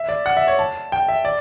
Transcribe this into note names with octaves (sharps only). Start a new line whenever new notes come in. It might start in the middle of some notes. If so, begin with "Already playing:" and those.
Already playing: E5
D5
F#5
E5
C#5
A5
G5
E5
D5